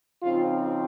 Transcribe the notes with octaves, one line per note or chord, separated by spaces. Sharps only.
C#3 F3 C4 D#4 F4